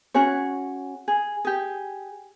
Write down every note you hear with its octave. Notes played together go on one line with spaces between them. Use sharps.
C#4 F#4 G#4 C#5
G#4
G4 G#4